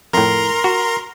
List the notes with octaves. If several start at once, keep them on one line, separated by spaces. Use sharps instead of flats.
F2 A2 A#4 A#5 C6
F#4